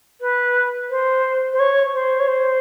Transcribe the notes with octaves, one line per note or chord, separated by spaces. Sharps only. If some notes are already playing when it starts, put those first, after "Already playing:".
B4
C5
C5
C#5
C5
C#5
C5